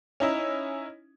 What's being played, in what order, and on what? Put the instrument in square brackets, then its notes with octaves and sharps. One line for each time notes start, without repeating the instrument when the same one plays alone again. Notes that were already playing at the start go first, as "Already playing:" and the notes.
[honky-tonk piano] C#4 D#4 E4